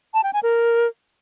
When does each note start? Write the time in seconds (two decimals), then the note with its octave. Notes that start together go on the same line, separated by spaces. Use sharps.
0.14 A5
0.24 G5
0.33 G#5
0.43 A#4